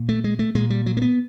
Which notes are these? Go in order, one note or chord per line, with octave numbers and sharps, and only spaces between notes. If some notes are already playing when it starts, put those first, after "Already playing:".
Already playing: A#2
A3
G#3
A3
A#2 G#3
G3
F#3
A#3
B3